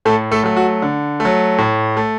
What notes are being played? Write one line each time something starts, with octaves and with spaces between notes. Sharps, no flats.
A2 A3 A4
A3 A4
F#3 A3
F#4
D3
A3
F#3
A2
A3